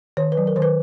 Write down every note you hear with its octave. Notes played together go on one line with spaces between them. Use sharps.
D#3 C#5
B4
F#3
A#4
D#3 C5
B4